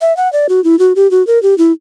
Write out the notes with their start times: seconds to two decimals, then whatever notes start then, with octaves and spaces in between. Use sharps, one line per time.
0.01 E5
0.17 F#5
0.33 D5
0.49 F#4
0.64 E4
0.79 F#4
0.96 G4
1.11 F#4
1.27 A#4
1.43 G4
1.58 E4